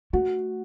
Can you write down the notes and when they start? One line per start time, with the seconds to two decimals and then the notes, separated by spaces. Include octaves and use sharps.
0.13 A3 F#4